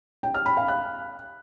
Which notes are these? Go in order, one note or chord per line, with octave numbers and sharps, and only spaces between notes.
G5
F6
B5
F5
F#6